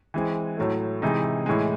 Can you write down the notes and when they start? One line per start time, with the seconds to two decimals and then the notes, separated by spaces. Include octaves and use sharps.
0.14 E3 G#3 C4
0.57 A2 F#3 A3
1.02 C3 E3 G#3 D#4
1.46 A2 E3 G#3